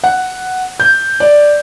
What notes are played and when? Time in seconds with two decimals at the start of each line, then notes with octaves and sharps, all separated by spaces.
0.04 F#5
0.80 G6
1.20 D5